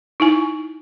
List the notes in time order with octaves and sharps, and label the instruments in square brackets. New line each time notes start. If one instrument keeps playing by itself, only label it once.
[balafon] D#4 E4 G#5